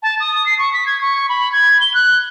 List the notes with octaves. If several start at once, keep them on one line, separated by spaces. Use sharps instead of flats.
A5
D#6
C7
C#6
B6
G#6
C#6
B5
G#6
G7
F#6